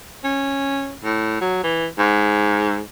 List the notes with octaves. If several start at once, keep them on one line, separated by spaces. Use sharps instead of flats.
C#4
A2
F#3
E3
G#2